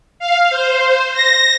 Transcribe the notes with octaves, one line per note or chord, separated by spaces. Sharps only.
F5
C5
A#6